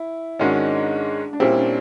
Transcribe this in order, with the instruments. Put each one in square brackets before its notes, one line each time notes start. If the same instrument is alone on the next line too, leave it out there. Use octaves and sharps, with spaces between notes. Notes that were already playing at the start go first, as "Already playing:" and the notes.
Already playing: [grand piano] E4
[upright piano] G#2 D#3 G#3 C#4 F#4 [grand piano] D4
[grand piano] D4
[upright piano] A#2 G3 C4 E4 [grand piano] C#4
[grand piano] D4